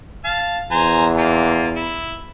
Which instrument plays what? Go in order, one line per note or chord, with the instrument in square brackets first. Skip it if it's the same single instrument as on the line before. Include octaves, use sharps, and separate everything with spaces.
[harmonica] F5 A5
[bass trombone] E2 [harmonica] C5 G#5 A#5
[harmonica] A#3 F4
E4